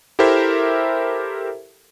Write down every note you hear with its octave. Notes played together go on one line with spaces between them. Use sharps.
E4 G4 A4 A#4 C5 E5